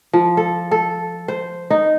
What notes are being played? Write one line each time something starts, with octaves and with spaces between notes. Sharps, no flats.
F3
A4
A4
C5
D#4